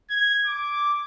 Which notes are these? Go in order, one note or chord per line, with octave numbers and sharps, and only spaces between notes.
G#6
D6